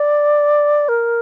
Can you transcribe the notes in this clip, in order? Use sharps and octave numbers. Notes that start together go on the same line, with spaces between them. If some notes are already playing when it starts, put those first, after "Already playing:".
Already playing: D5
A#4